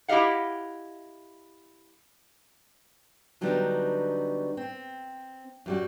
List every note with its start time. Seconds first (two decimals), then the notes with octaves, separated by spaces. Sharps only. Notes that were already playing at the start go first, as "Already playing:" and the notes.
0.08 E4 G4 D#5 F5 F#5
3.41 D3 F#3 G3 B3 D4 D#4
4.57 C4
5.66 F#2 G3 F#4